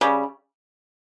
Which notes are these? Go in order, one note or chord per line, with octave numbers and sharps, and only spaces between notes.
C#3 G3